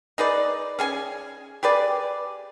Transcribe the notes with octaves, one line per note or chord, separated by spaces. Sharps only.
D#4 G#4 B4 D5
C#4 G#4 G#5
G4 G#4 B4 D5